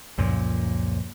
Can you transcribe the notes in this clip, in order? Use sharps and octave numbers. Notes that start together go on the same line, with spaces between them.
C#2 F#2 A#2 F3